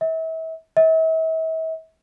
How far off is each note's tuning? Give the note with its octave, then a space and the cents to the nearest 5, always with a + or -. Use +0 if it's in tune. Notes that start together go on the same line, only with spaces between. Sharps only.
E5 -35
E5 -40